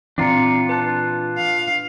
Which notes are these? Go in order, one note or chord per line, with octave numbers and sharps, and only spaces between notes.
A#2 E3 C4 D4 F4 A#5 C#7
B4 A5 F#6
F5